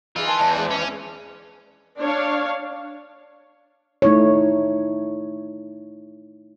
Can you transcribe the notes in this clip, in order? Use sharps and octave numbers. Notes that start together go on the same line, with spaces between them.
E3 D#4 F4 G#4 D#5
G#5 A5 C6
E2 D#5
G#3 D4 B4 C5 D5
C#4
D4 C#5 F5
A3 D#4 E4 C#5